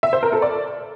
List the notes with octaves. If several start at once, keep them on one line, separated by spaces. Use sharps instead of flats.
E5
C5
A#4
A4
D5